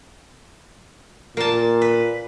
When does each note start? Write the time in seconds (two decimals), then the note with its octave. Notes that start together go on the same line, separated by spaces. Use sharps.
1.37 A#2 A#3 A5
1.82 B4